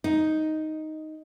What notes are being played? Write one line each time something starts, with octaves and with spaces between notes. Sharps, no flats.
D#4